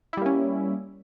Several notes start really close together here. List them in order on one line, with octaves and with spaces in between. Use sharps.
E4 G3 A#3 C#4